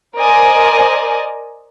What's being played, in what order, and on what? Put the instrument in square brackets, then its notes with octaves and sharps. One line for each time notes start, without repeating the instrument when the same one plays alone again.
[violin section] A#4 C5 D5 D#5 G#5